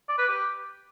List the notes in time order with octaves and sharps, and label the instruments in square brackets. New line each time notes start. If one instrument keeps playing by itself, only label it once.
[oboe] D5
B4
G4